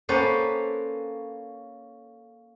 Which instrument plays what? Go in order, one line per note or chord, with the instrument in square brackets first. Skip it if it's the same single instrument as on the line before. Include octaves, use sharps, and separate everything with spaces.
[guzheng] A#3 C#4 A4 B4 C5 F#5